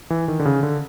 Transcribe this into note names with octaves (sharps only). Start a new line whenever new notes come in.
E3
D#3
D3
C#3
D3